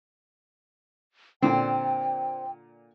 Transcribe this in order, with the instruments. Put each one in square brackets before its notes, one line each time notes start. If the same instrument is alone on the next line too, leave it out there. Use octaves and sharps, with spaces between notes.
[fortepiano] A#2 D3 [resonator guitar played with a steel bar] C4 [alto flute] G5